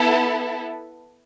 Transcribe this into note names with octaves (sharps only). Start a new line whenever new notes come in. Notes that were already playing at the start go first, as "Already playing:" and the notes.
Already playing: B3 E4 A4